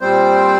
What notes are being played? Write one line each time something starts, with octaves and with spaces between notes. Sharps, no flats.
A#2 G3 C4 C5